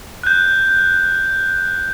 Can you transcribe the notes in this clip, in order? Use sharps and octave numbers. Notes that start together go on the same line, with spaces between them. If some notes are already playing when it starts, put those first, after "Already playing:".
F#6 G6